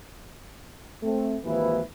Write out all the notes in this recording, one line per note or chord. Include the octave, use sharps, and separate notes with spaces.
A3 C4
G#1 D#2 E3 F3 E4 B4